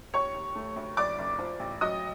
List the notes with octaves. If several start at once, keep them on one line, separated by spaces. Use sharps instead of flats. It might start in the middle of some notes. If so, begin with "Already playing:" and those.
D#2 C#5 C#6
D#2
A3
D2
F#1 D5 D6
F#1
F3
A1
F#3 D#5 D#6